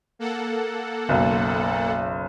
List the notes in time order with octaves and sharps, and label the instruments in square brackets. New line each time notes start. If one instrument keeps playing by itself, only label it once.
[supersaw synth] A#3 A4 F#5
[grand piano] F#1 B1